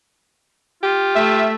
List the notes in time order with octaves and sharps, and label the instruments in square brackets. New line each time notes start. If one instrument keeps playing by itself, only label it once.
[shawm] F4 [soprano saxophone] G4
[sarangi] A3 [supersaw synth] E5